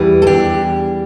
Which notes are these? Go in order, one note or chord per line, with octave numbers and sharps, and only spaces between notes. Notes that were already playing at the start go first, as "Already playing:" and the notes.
Already playing: E2 E3 G3
A4
D4 G4